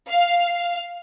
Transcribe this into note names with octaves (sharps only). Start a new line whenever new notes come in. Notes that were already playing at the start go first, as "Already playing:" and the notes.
F5